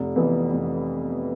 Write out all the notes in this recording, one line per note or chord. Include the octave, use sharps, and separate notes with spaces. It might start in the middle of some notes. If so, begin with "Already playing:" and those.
Already playing: F1
F2 E3 B3
F1